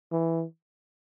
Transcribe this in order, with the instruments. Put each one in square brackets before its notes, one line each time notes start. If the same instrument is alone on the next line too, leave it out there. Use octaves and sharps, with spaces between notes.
[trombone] E3